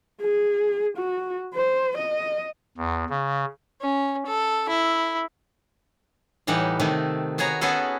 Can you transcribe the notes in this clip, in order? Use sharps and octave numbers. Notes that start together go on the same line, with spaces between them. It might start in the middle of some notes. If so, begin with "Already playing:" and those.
G#4
F#4
C5
D#5
E2
C#3
C#4
A4
E4
A2 E3 G3 D#4 F#5
C3 D#3 A3 D#4
B3 F#4 G#4 C#5 A#5
B3 C#4 F#4 G#4 A4 B4